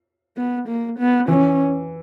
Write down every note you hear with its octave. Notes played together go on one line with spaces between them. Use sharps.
B3
A#3
B3
E3 C#4